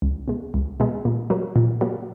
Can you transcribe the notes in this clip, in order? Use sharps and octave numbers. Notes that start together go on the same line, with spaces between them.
C#2
B2 G#3
C#2
B2 G#3
A#2
F#3 A#3
A#2
F#3 A#3